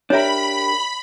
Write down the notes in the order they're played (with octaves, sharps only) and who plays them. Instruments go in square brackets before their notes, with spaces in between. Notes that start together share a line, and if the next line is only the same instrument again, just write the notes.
[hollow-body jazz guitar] D4 G4 A#4 [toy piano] C#5 E5 [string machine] B5